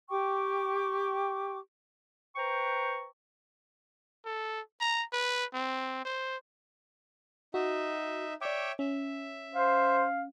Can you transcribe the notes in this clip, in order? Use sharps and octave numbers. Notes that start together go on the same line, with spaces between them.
G4 G5 C#6 D6
B4 C5 G5 A#5 C#6
A4
A#5
B4
C4
C5
D#4 F#4 E5
C#5 D5 E5 G5 D6
C#4 E5
C5 F5